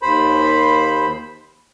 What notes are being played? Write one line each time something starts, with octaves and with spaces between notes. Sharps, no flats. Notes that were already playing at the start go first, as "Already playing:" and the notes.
D#2 C5 B5